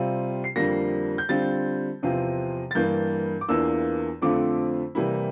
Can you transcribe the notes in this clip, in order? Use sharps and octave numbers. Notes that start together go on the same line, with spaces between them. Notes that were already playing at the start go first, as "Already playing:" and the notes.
Already playing: C3 G3 C4 F4
C7
F2 D3 G3 A#3 A#6
G6
D3 G3 C4 F4 A6
E2 C3 F3 C4 F4
A6
G2 E3 A#3 G6
D6
E2 E3 A#3 D4 F4 E6
F2 D3 A3 C4 F4 D6
C3 E3 G3 A#3 E4